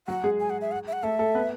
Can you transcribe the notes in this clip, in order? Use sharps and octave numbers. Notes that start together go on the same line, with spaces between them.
F#3 F#4 F#5
G#3 G#4
G#5
F#5
E5
F#5
E5
F#5
A3 A4 E5
A3 A4
B3 B4